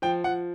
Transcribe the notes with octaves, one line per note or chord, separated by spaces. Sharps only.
F3 G5
F3 F#5